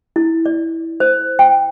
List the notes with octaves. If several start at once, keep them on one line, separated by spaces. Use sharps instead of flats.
E4
D5
C5
G5